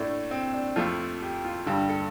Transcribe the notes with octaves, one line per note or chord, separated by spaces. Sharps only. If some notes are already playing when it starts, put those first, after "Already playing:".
Already playing: A2 A3 D4
C4
D4
F2 F3 A3 F4
G4
F4
G2 D3 G3 G4
A4